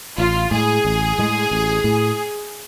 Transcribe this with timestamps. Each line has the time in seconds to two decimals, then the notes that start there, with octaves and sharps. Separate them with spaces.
0.18 A1 F4
0.51 A2 G#3 G#4
0.85 A1
1.18 A2 G#3
1.51 A1
1.84 A2